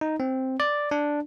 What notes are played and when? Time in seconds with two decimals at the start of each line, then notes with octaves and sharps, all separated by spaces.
0.01 D#4
0.20 C4
0.60 D5
0.91 D4